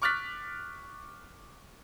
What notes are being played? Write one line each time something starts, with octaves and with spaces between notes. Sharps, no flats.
C#6 D6 F6 F#6 A6 B6